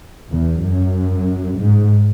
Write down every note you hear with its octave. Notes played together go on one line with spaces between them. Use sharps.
E2
F#2
G#2